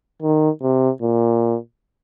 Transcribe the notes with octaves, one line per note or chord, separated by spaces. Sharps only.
D#3
C3
A#2